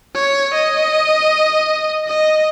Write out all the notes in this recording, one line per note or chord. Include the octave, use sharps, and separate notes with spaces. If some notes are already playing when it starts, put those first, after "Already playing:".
C#5
D#5
D#5